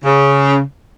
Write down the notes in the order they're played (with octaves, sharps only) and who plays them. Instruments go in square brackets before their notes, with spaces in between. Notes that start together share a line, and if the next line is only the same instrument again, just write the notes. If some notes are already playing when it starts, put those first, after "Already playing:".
[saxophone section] C#3